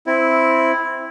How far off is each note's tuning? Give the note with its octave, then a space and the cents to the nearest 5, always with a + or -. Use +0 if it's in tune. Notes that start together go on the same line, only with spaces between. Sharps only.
C4 +0 E4 +0